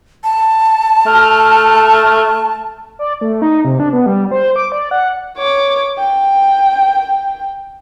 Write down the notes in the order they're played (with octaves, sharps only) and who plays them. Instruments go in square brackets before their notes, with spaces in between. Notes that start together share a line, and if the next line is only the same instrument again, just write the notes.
[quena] A5
[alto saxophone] A3 [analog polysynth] F6
[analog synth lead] D5
A3
D#4
C3
D4
B3
G3
C5
D6
D5
F#5
[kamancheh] C#5 D6
G5